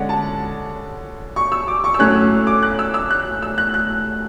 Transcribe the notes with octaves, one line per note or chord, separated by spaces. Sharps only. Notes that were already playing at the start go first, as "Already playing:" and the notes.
Already playing: D3 G#3 C#4 D5 F#5
A5
C#6
E6
D6
C#6
E6
A2 F#3 A3 C#4 F#6
E6
D6
F#6
E6
E6
F#6
E6
F#6
F#6